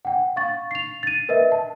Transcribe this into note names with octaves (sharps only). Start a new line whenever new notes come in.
F#5 G5
F5 C#6 A6
C7 F7
A6 D#7
A#4 B4 D#5 E5
A5